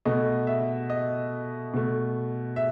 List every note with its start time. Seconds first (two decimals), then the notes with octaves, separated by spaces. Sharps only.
0.05 B2 A3 D#5
0.47 E5
0.90 D#5
1.74 B2 A3
2.56 E5